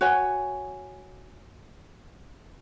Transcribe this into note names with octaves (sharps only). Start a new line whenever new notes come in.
F#4 C#5 G#5